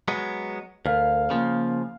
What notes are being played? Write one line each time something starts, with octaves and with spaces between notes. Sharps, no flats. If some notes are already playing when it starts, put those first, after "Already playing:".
F#3 G#3 B3
D2 A#4 F5
C#3 F3 A#3